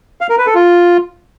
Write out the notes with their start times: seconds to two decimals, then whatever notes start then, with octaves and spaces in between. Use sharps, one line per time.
0.21 F5
0.29 A#4
0.38 B4
0.46 A4
0.55 F4